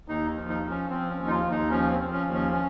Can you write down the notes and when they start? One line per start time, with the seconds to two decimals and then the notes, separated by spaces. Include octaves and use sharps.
0.08 D#2 D#4
0.36 F3
0.49 D#4
0.63 F3
0.70 C#4
0.90 F3 C4
1.10 C#4
1.16 D#2
1.26 D#4
1.30 F4
1.44 D#2
1.50 D#4
1.71 F3 C#4
1.92 C4
1.99 F3
2.13 C#4
2.26 D#2
2.33 C#4
2.53 C#4